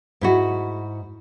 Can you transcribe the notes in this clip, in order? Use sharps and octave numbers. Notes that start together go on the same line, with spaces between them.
G#2 E4 F#4